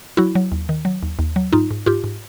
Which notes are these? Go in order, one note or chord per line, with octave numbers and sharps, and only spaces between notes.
F#3 E4 F#4
F#3
D#2
D#3
F#3
D#2
D#2
F#3
G#2 D#4 F4
G#2
G#2 F4 G4
G#2